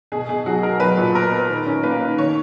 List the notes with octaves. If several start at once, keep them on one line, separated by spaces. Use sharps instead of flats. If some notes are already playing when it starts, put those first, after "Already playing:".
B2 G#4
B2 G#4
F#3 F#4
B2 A#4
F#3 B4
A#2
B3 A#4
B3
D#3
C#4
A#3 B4
D#3
D#3 C#5